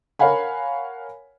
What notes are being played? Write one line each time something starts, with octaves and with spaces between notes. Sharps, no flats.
A#4 C#5 F5 F#5 G#5 B5